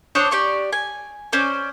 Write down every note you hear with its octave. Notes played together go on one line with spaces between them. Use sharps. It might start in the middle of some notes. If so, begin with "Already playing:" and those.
D4 C5 C#5 D#6
G4 D5 C#6
G#5
C#4 C5 D5